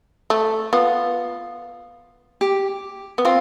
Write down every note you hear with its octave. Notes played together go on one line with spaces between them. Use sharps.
A3
B3 F4
G4
B3
C4 F4